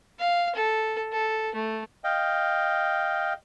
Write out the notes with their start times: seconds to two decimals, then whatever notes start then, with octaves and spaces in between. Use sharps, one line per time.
0.19 F5
0.55 A4
1.12 A4
1.55 A3
2.04 D#5 F5 G5